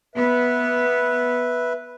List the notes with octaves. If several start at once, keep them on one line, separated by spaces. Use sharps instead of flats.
B3 B4 E5